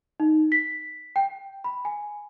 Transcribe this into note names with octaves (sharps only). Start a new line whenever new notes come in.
D#4
B6
G5
B5
G#5